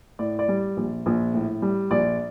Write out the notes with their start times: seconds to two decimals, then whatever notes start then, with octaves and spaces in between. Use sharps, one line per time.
0.19 A2 D5
0.39 D5
0.48 G3
0.77 A#1
1.06 A#1
1.34 A2
1.62 G3
1.91 A#1 D5